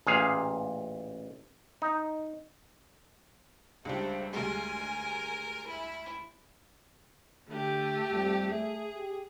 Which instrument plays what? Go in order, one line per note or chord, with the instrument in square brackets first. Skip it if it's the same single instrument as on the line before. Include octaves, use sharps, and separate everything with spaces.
[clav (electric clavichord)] A1 A#2 G#4 F5
D#4
[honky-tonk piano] C#2 D4 G4 [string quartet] G3 A3 C5
[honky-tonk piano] D2 G3 G#3 [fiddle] A#4 [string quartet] G#5
[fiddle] E4
[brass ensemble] D3 [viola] A3 G4
[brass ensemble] F2 G3
[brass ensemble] A3 E5 [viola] G#4
[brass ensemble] G4